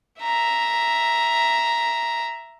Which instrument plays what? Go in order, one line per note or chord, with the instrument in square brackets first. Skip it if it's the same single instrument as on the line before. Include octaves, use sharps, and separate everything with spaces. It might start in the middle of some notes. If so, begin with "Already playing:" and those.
[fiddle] E5 A#5